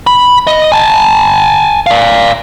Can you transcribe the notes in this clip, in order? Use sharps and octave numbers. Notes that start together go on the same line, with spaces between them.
B5
D#5
G#5 A5
D5 F5